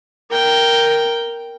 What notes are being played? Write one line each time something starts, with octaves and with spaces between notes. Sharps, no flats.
A#4 G5